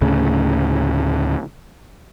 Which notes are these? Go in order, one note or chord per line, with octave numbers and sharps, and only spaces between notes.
D2 A2 C#3